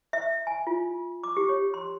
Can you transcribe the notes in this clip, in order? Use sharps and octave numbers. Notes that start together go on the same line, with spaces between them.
E5
G#5
F4
D6
G4
C#5
C6